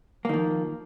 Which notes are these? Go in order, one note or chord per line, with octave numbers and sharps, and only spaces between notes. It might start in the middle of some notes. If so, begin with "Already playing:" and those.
D#3 F3 A#3